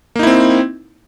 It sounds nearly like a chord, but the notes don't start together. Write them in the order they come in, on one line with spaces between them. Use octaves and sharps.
A#3 D#4 E4 C4